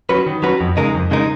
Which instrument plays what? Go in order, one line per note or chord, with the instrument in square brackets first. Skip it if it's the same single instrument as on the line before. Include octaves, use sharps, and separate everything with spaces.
[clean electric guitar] F#3 C#4 F#4 B4
D#3
F#3 C#4 F#4 B4
F2
C#3 G#3 D#4 A#4
F2
C#3 G#3 D#4 A#4